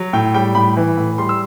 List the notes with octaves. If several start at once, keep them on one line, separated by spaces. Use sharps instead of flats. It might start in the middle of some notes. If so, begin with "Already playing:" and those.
Already playing: F#3
A2 G5
G3 G5
A2 B5
E3
A2
G3 C6
E6